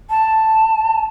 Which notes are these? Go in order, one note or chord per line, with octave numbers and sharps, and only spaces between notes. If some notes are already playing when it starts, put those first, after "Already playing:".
A5